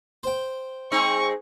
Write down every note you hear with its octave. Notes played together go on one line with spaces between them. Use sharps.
C5 G5
G#3 C4 D#4 C#6